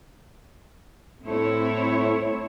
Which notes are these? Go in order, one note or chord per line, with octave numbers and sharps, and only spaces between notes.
A2 A3 C4 E4 C#5